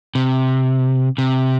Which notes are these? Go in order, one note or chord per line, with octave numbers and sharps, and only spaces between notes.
C3
C3